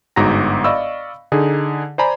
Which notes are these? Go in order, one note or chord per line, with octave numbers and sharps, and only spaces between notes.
G1 G#2 F#4 A#5 A#6
D5 D#5 F5 B5 C#6 E6
D3 D#4 G#4
C5 D5 G#5 A#5 B5